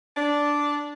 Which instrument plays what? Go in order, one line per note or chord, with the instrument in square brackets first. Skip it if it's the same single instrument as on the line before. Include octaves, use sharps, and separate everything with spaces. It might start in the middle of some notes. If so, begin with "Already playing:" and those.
[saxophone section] D4